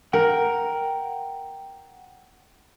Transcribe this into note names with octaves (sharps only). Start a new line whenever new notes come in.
A#4 F#5 G5